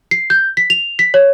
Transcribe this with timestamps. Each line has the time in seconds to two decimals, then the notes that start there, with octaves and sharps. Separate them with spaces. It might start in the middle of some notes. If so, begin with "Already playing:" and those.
0.11 C7
0.30 G6
0.57 B6
0.70 F7
0.99 B6
1.14 C#5